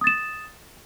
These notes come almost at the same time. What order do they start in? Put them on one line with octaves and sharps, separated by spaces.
D#6 A6 E7